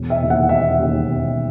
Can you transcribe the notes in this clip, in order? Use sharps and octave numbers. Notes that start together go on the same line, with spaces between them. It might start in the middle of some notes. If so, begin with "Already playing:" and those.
Already playing: E1
E5
D#2 C#3
F#5
E1 E5
D#2 C#3
E1